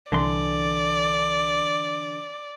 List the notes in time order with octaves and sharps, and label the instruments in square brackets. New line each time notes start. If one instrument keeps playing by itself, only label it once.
[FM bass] C2 [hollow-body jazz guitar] D3 E3 C6 [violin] D5